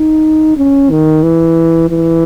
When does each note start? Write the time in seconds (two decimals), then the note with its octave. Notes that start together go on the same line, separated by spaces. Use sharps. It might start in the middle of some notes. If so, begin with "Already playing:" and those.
Already playing: D#4
0.57 C#4
0.90 D#3
1.23 E3
1.89 E3